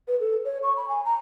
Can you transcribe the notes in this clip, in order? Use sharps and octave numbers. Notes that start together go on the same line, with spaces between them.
B4
A4
C#5
C#6
B5
G#5
A#5